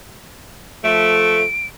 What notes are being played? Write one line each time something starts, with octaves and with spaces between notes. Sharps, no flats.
F3 A3 D7